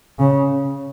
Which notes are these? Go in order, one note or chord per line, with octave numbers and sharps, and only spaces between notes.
C#3